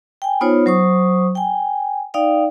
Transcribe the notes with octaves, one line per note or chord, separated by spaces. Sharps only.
G5 G#5
B3 D#4 F4 C5 C#5
F#3 C5 C#6 D#6
G5 G#5
D#4 D5 F5 G5